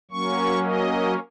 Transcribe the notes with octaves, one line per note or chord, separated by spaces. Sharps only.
F#3 A#3 C#4 C#6
D#5